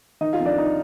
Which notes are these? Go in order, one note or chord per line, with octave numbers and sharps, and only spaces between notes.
D#3 D#4 D#5
F4 F5
F2
D4 D5
D#4